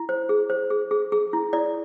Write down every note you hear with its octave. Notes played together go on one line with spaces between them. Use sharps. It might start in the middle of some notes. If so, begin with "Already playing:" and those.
Already playing: E4
C5
G#4
C5
G#4
G#4
G#4
E4
E4 D5